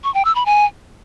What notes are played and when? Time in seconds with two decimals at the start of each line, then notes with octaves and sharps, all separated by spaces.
0.04 C#6
0.14 G5
0.25 E6
0.35 B5
0.46 G#5